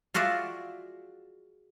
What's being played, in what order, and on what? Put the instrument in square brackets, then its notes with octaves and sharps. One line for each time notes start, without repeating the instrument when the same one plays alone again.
[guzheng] F4 F#4 G#4 D5 E5